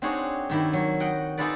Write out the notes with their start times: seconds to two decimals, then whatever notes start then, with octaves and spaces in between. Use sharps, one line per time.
0.02 C4 D4 D#4 F#4 G#4 C#5
0.49 G2 D#3 E4
0.73 F#3
1.00 D#5 F#5 G5
1.38 D#4 F4 G#4 A4 B4 D5